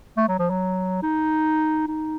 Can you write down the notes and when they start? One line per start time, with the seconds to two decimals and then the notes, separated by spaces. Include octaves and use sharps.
0.17 A3
0.28 F#3
0.39 F3
0.50 F#3
1.03 D#4
1.88 D#4